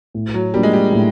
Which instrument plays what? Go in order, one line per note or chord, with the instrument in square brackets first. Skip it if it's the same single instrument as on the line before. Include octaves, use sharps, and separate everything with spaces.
[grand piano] A2
[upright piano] F#3
[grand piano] F3 A#3 D4 [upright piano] G3
[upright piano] G#3
G3
[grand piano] A2